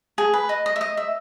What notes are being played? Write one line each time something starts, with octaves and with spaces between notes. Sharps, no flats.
G#4
B4
D#5
D#5
E5
D#5
E5